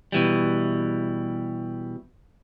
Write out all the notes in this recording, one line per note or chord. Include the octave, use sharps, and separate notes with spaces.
B2 E3 G3